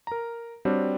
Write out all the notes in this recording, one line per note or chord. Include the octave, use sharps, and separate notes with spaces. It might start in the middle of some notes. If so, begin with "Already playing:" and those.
A#4 A#5
G3 C4 D4 F#4 C#5 D5